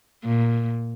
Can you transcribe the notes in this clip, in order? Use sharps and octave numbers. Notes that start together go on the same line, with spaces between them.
A#2